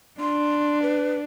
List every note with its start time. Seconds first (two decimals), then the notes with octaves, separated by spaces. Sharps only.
0.20 D4 C6
0.82 B4